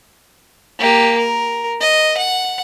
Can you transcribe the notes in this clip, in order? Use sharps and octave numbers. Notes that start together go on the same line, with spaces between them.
A#3 G4
A#4
D#5
F#5